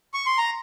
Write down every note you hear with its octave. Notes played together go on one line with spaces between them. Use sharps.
C#6
C6
A#5